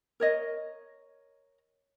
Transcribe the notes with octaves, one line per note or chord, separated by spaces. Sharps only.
A#4 C#5 D#5